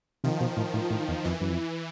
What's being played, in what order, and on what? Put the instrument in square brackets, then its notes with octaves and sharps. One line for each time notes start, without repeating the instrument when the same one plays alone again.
[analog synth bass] C3 [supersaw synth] D#3 F3
[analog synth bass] B2
A2
A2
A2
E2
[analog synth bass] F2 [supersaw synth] E3
[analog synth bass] F#2
F2